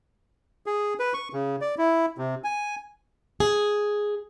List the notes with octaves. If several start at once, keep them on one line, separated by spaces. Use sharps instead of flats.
G#4
B4
C#6
C#3
D5
E4
C3
G#5
G#4